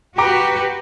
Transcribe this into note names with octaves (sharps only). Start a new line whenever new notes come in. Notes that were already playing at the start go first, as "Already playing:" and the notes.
F#4 G4 B4 G5 A#5 D6